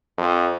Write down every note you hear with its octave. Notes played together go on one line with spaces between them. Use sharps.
F2